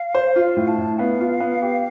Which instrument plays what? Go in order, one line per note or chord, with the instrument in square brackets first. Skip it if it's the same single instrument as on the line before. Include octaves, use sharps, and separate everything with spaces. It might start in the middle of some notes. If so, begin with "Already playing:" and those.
Already playing: [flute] F5
[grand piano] C5
[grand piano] F4 [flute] F5
[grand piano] A2
[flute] A5
[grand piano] A2
[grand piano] B3 [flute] F5
[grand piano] F4
B3
G4